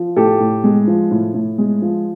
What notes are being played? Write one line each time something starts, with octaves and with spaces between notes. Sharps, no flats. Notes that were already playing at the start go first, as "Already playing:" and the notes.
Already playing: F3
A2 G4 A4
A2
G#3
F3
A2
A2
G#3
F3